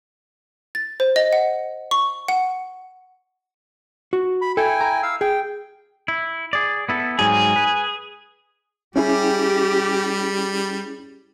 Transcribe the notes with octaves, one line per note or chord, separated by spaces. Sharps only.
A6
C5
D#5
F#5
C#6
F#5
F#4
B5
E4 A4 G5 G#5
A#5
F5 E6
G#4 G5
E4
G#4 D5
B3 E4 A4
G#2 F#3 G3 G#4 G#5
B4
G3 C#4 E4 G4 G#4